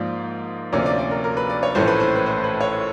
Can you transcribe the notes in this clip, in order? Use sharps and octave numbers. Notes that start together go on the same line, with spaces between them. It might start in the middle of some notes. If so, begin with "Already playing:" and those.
Already playing: G#2 F3 A#3 D5
D2 C3 F3 A#3 C#4 D5
D5
D5
A#4
A#4
B4
D5
C#5
A#1 A2 E3 A3 C#4 C5
B4
C5
B4
C5
B4
C#5